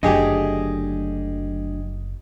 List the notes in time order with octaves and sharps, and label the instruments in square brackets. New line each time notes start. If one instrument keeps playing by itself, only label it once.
[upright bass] F#1 [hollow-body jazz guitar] D3 F#3 A3 [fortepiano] G4 G#4 D#5